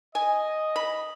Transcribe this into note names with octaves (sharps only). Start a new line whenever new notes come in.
D#5 G#5
B5